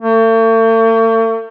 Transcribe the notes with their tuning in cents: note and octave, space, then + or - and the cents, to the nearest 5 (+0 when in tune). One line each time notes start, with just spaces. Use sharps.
A3 +45